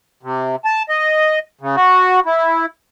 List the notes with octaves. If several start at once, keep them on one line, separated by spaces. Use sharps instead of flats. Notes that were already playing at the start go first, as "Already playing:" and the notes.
C3
A5
D#5
C#3
F#4
E4